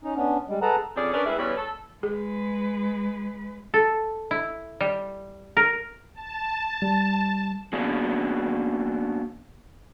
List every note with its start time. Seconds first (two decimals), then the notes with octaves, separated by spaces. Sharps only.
0.04 C#4 D#4
0.16 B3 C#4 D4
0.48 G3 G#3
0.62 G#4 A4 B4 F#5 A5 A#5
0.96 F2 C4 C#4 G#4 D5
1.13 C#4 D4 A#4 B4 D5
1.26 G3 G#3 C4 E4 B4 E5
1.39 E2 E3 G3 C#4 B4
1.57 A4
2.03 G#3 G#4 B4
3.74 A4
4.31 E4
4.80 G3
5.57 A#4
6.14 A5
6.82 G3
7.73 A#3 B3 C#4 D4 F#4 G#4